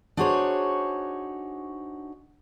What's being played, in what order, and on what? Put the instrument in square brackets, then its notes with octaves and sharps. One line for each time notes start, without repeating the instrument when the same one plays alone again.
[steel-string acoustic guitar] D4 D#4 F#4 G#4 C5 C#5